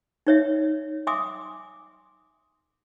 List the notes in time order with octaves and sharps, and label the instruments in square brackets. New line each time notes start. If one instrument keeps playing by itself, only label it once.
[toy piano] D#4 C#5 E5
E5 G#5 C6 D6 D#6